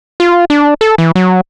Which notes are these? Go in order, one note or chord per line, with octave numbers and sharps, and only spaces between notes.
F4
D4
A4
E3
F#3